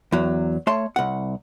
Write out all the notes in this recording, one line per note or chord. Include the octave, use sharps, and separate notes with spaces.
E2 F#3
A3 C#5 A5 C6
C2 F#5